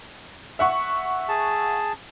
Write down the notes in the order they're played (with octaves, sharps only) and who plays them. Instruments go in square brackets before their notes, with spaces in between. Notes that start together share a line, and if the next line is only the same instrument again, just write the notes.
[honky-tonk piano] E5 F#5 C#6
[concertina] G#4 A5